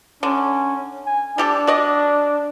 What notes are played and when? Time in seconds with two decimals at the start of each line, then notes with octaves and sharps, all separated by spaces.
0.23 D3 C#4
1.06 G#5
1.38 G3 D4 G4 A4
1.67 F#4 D5 D#5